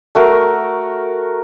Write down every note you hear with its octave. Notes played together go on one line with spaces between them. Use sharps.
A3 F#4 A#4